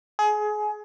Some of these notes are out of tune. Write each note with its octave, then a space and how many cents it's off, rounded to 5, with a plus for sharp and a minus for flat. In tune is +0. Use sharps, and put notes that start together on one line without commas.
G#4 +25